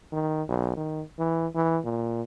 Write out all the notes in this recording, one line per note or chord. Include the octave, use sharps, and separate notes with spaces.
D#3
B1
D#3
E3
E3
A#2